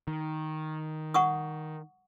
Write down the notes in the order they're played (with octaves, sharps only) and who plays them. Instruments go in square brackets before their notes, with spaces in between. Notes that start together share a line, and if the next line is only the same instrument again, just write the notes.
[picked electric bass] D#3
[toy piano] F#5 C#6 D#6